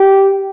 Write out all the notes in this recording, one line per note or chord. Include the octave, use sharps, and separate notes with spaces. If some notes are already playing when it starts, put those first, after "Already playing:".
Already playing: G4